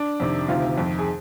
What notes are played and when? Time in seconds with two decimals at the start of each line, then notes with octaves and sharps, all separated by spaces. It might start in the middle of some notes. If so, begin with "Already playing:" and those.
Already playing: D4
0.20 F2 C3 D#3
0.48 D2 C3 D#3 F4
0.77 F2 D#3
0.99 G#4